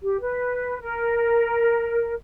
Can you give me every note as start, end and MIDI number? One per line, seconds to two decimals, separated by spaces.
0.01 0.20 67
0.21 0.78 71
0.81 2.14 70